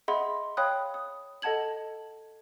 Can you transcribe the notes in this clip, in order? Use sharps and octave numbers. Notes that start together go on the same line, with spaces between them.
G#4 D#5 E5 F#5 B5 C6
C#5 F5 G5 B5 D#6 F#6
D#6
A4 D#5 F#5 A5 G#6 F#7